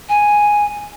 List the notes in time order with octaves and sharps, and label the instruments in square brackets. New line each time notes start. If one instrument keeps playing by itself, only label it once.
[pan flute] G#5